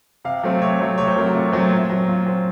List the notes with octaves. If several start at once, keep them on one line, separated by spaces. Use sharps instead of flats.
C3 F5
F#3 A3 C4
C3 C#5
F#3 A3 C4
C3 C#5
C5
F#3 A3 C4 A#4
F#4
C3 F4
F#3 A3 C4
A#2
F#3 C4
A#2 F4
F#3 C4